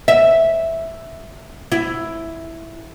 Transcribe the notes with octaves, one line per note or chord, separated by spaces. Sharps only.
E5
E4